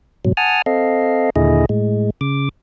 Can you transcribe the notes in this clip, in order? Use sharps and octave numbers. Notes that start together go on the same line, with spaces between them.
G#2 B2 F#3
F#5 G#5 A5 D#6 F6
C4 A4 D#5 F5
D#2 A#2 D3 E4 G#4 D#5
A2 G#3
C#3 D6